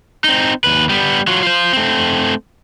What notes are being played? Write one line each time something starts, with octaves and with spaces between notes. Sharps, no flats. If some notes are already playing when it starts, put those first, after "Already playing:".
C4 D#4
D#2 B4
G3 B3
F#3 F4
F4 C5
A3 C4